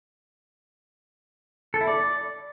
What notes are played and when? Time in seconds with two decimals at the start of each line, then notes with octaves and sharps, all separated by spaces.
1.74 A4
1.81 E4
1.87 D5